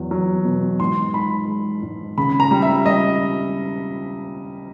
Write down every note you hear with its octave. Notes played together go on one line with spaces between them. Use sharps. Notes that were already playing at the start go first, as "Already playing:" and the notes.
Already playing: E2 F#3
F#3
B2
G#2 C6
G#2 B5
G#3
G#2
C#3 B5
A#5
G3
E5
G3 D#5